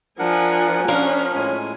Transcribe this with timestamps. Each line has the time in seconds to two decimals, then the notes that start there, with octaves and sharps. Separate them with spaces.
0.19 F3 D4 A#4 F#5 G#5
0.88 F3 C#4 D4 A#4 C5 F6
1.36 A2 G#3 G#5